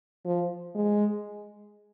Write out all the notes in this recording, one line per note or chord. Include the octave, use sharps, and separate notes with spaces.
F3
G#3